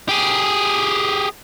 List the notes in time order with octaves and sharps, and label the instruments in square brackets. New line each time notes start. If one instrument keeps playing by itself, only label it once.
[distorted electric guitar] G4 G#4